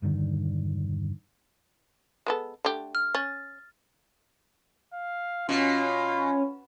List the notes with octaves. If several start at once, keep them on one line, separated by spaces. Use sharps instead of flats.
E1 G2 D3 D#3
G#3 B3 A4
D3 A3 G4
F6
C#4 A6
F5
B2 C#4 F4